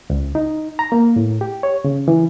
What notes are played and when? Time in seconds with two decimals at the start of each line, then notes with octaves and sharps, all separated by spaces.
0.10 C#2
0.35 D#4
0.79 A#5
0.92 A#3
1.16 A2
1.41 G4
1.63 C#5
1.85 C#3
2.08 E3